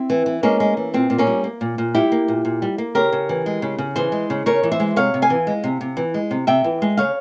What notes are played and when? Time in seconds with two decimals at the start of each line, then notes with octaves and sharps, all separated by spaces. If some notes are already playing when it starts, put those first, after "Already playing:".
Already playing: C4 E4
0.10 E3
0.26 E3
0.43 G#3 A#3 C#4
0.60 G#3
0.77 E3
0.94 A#2 C4
1.10 A#2
1.18 A#3 C#4
1.27 G3
1.44 A#3
1.61 A#2
1.78 A#2
1.95 G3 E4 G4
2.12 A#3
2.28 A#2
2.45 A#2
2.62 G3
2.78 A#3
2.95 C#3 G4 A#4
3.13 C#3
3.29 E3
3.46 G#3
3.62 C#3
3.78 C#3
3.96 E3 G#4 C5
4.12 G#3
4.30 C#3
4.46 C#3 A#4 C#5
4.63 E3
4.72 C5 E5
4.80 G#3
4.96 C3 C#5 F5
5.14 C3
5.22 F5 G#5
5.30 E3
5.47 G#3
5.64 C3
5.81 C3
5.97 E3
6.14 G#3
6.31 C3
6.47 C3 E5 G5
6.64 E3
6.82 G#3
6.97 C#3 C#5 F5